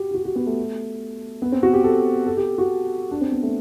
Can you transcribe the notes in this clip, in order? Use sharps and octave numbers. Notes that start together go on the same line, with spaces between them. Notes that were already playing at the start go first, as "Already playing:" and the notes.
Already playing: F#4 G4
G4
F#4
F#4
B3
A3
B3
C4
F#4
G4
A4
A4
G4
F#4
D4
C4
B3
A3